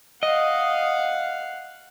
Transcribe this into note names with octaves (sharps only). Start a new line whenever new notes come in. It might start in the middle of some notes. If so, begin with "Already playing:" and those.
D#5 F5 F#5